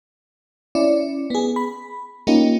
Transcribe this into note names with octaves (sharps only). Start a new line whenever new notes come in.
C#4 E4 D5
B3 G#4
B5
A#3 C#4 D#4 F4 G4